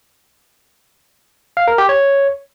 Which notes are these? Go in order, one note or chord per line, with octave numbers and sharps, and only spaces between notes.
F5
A#4
G4
C#5